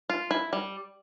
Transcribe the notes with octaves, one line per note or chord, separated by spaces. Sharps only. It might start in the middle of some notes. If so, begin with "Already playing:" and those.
F4
E4
G3